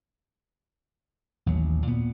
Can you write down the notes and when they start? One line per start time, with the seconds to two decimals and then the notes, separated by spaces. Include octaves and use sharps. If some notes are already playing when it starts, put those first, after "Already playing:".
1.46 A1 D#2 F#3
1.87 A#2 B3